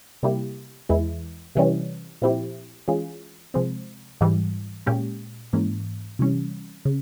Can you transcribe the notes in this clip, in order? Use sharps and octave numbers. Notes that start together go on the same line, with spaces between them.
C3 G3 A#3 E4 G4
E2 E3 G#3 E4
C3 E3 G3 C#4
A#2 F3 C4 E4 G4
E3 G#3 C#4 F4 G#4
C3 F3 G#3 C4
G#2 E3 G3
A#2 G#3 C#4 G4
G#2 E3 A#3 C#4
C3 E3 G3 C#4
C#3